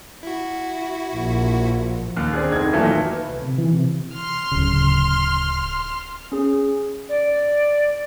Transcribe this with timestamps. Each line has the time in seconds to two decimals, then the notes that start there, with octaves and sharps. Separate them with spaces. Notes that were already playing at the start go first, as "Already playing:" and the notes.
0.23 E4 F#4
1.15 A#1
2.17 D#2
2.33 C4 D4 G#4
2.52 F1 D#4 G#6
2.73 A#2 D#3 E3 F#3 A3 A#3
3.13 B4
3.28 C2
3.42 C3
3.58 E3
3.73 C3
4.16 C6 F6
4.52 D1 C#3
6.32 C#4 G#4
7.09 D5